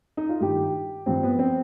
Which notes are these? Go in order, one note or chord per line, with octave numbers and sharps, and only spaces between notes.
D#4
F4
G2 D#3 G4
G2 F3 C4
B3
C4